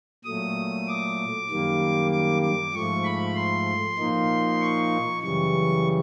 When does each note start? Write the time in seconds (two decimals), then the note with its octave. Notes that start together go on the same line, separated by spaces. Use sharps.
0.24 A#2 F#3 A3 D#6
0.87 D6
1.50 F#2 D#3 G3 A#3
2.11 D6
2.42 D6
2.74 G#2 F3 A3 C#6
3.04 B5
3.36 C6
3.98 A#2 F3 A#3 D#4
4.61 C#6
5.22 F#2 C#3 E3 G3 C#6